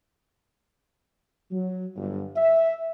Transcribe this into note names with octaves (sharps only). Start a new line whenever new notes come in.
F#3
G1
E5